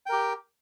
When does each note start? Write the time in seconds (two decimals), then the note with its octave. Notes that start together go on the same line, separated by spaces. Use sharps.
0.06 G5
0.09 A#4
0.12 G4